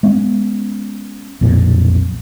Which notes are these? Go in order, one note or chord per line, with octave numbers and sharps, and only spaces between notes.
G#3 B3 C#4
B1 F2 A#2